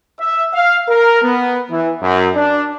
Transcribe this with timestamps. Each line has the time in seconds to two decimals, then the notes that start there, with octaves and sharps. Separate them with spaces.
0.20 E5
0.54 F5
0.89 A#4
1.22 B3
1.70 E3
2.02 F#2
2.35 D4